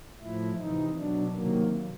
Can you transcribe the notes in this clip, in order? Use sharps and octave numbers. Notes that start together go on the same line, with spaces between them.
A2 F3 E4
C3 E3 D#4
B2 F#3 D4
C3 D#3 F#3 A#3